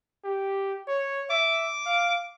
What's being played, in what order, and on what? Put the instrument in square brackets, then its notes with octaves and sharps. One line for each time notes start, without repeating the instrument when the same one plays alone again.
[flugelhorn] G4
C#5
[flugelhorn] E5 [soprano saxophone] D6
[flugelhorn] F5